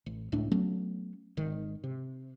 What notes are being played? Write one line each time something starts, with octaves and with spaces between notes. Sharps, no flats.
A1
C#2 A2 A3 D4
F#3 A3 B3 C#4
G#1 D#3
C3